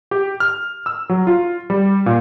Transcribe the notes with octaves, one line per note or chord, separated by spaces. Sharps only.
G4
F6
E6
F#3
F4
G3
A#2